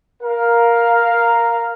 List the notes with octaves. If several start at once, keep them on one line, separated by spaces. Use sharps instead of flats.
A#4 F5